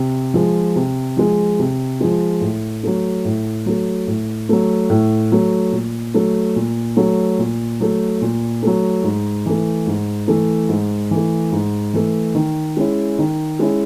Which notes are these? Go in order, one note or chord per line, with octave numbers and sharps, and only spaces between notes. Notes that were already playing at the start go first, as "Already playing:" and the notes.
Already playing: C3
F3 G#3
C3
F3 G#3
C3
F3 G#3
A2
F#3 A3
A2
F#3 A3
A2
F#3 A3
A2
F#3 A3
A#2
F#3 A3
A#2
F#3 A3
A#2
F#3 A3
A#2
F#3 A3
G#2
E3 A3
G#2
E3 A3
G#2
E3 A3
G#2
E3 A3
D#3
G#3 C#4 E4
D#3
G#3 C#4 E4